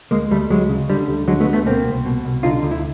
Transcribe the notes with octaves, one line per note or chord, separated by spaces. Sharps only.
D2 G#3 A#3
D2 G3 A3
D2 F#3 G#3
C#3
D3 G3
D2
D3 F#3 G#3
A3 B3
D2
A3 B3
B2 A#3 C4
C2
B2
C2
D3 D#4 F4
D2
E4